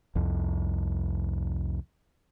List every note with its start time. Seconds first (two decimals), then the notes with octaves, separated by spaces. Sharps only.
0.15 C2 F2